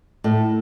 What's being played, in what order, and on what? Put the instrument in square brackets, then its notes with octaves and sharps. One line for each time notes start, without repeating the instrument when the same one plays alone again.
[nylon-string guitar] A2